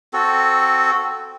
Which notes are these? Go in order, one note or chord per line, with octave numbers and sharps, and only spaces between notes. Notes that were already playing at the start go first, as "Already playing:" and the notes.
C4 F#4 A4